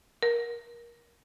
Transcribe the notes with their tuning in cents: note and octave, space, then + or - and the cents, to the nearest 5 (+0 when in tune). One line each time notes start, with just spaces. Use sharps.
A#4 +25